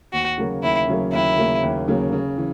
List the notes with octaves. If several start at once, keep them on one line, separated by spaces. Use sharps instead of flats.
D#2 F#4
C#3 F#3 A#3
D#2 E4
C#3 F#3 A#3
D#2 E4
C#3 F#3 A#3
D#2
C#3 F#3 A#3
C#3
E3